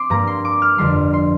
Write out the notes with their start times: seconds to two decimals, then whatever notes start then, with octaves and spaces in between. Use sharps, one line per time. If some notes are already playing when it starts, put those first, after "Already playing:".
Already playing: C4 C6 D6
0.10 G2 G3 A#3 A#5
0.27 C6
0.45 D6
0.62 F6
0.78 G1 F2 D3 G3 C6
1.13 C6